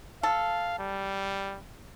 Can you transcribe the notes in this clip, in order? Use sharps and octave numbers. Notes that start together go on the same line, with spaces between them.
A4 F5
G3